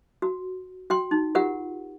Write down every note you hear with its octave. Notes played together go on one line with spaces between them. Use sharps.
F#4
F#4 G5 C6
D#4
F4 G4 A#4 F#5